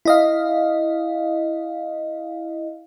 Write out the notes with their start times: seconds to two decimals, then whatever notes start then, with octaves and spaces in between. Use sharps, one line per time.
0.05 E4 D#5 F5